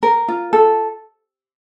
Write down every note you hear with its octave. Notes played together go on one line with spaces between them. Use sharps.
A#4
F4
A4